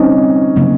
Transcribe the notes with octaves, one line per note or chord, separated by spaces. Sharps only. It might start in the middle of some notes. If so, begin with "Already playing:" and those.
Already playing: D3 G3 C4 C#4 D#4
C#3 F#3 A#3